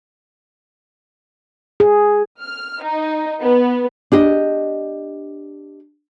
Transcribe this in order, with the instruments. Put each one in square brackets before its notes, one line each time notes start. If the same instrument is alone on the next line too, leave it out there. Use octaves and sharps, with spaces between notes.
[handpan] G#4
[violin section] F6
D#4
B3
[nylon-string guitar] D4 G4 D#5